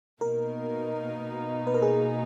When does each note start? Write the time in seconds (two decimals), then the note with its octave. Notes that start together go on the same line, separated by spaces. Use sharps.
0.21 B2 A#3 D#4 A#4
1.67 B4
1.74 A#4
1.82 G#4